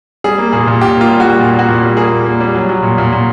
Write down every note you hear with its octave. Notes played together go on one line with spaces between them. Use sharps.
G3 G#4
A#3
A#2 G#4
A#2
A#2 G4
A#3 F4
G3
F#4
G3
A#2
A#3 F#4
A#2
G3
A#3 G#4
A#2
A#3
G3
F#3
F#3
A#2
A#2
A#2